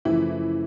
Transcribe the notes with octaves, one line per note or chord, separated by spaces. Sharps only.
F#2 C#3 E3 F3 A3 E4